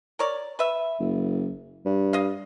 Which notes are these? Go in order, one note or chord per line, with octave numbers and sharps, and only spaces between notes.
A#4 C#5 D5
B4 E5
F#1
G2
D#5 F5